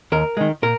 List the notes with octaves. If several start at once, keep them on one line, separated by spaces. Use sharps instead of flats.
D#2 A#4
D#3 G#3
A#2 A#4